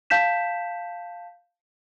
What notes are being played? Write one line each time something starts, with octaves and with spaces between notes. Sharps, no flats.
F5 A5 G6 B6 E7